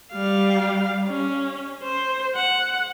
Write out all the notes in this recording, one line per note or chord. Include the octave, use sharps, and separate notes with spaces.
G3 F5
C#4
C5
F#5